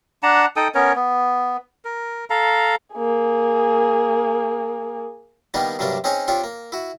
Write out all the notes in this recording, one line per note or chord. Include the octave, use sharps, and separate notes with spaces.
D4 F#5 A5 A#5
D#4 A4 G5 D#6
B3 C#4 A#4 C#5
B3
A#4
A4 F5 A#5
A#3 G#4
D#3 G3 A#3 B3 D4 D#4
G2 C3 F#3 G3 A#3 D4
C4 C#4 D#4 G#4 C#5 G#5
C4 D4 F4 G4 C#5
A#3
E4 F#4